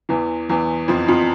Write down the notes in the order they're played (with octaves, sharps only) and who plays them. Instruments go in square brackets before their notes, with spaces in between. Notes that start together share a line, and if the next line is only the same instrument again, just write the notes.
[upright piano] E2 E3
E2 E3
F2 F3
F2 F3